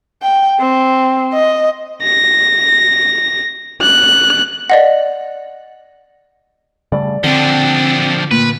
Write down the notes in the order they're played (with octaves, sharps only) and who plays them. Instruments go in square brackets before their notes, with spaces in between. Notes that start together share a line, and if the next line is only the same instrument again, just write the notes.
[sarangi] G5
C4
D#5
[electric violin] A#6
F#6
[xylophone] D5 D#5 F#5
[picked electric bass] C#3 G3 A3 [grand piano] D5
[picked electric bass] D3 [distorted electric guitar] F3 D4 [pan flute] C4
[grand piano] A#2 [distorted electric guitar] B4